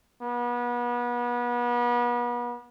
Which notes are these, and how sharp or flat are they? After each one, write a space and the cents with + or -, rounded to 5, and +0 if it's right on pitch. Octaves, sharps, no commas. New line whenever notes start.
B3 -35